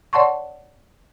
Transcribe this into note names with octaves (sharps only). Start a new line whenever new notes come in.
C#5 D5 F#5 A5 C6 C#6